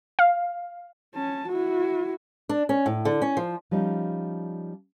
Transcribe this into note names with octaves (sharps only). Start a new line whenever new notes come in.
F5
C#4 A5
E4 F#4
D4
C#4
A2
D3
C#4
F3
F3 G3 C#4 D#4